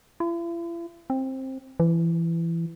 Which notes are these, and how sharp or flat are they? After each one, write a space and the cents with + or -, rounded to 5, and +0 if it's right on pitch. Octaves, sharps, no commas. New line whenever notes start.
E4 +45
C4 +15
E3 +20